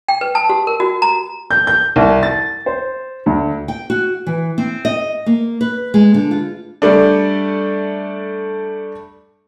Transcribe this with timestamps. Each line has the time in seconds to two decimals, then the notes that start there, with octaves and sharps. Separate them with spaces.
0.08 G5
0.21 B4
0.35 A5
0.50 G4
0.67 A#4
0.80 F#4
1.02 A#5
1.51 G6
1.67 G6
1.96 C2
2.23 A6
2.66 C5
3.26 D2
3.68 G5
3.90 F#4
4.26 E3
4.58 C4
4.85 D#5
5.26 A#3
5.61 B4
5.94 G#3
6.14 D3
6.31 F4
6.82 G3 A3 D4